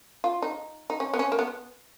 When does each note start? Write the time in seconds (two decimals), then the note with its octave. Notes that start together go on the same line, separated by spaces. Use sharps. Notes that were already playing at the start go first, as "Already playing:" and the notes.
0.24 F4
0.42 D#4
0.90 D#4
1.00 C#4
1.13 B3
1.19 C#4
1.32 A#3
1.39 B3